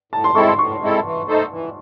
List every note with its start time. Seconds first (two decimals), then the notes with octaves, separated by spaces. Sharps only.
0.12 A2 A5
0.24 C6
0.35 G#3 C4 E4 A4 C#6
0.48 C6
0.58 A2 C#6
0.81 G#3 C4 E4 A4
1.04 E3
1.27 A3 D#4 A4 C5
1.51 E3